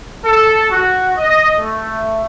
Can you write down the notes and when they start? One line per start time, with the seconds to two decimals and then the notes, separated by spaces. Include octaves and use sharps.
0.24 A4
0.70 F#4
1.17 D#5
1.59 A3